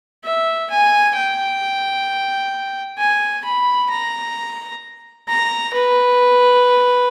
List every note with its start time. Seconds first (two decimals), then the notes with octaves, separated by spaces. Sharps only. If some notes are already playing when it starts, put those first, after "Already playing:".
0.25 E5
0.70 G#5
1.16 G5
2.99 G#5
3.45 B5
3.91 A#5
5.28 A#5
5.74 B4